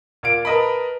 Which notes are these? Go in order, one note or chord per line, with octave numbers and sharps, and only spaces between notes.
A#2 F5 D7
A#4 B4 D#5 A5 B5